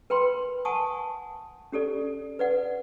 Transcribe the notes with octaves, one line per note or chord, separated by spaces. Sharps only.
A#4 B4 G5 B5 C6
F#5 G#5 A5 C#6 D#6
C#4 G4 A4 D5
B4 D5 F#5